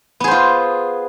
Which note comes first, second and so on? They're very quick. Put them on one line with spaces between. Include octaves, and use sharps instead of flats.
B3 G#4 C5 F4